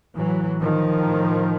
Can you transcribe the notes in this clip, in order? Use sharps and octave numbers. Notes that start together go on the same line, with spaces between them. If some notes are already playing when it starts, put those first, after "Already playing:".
A2 E3 F#3
D#3 F3
A2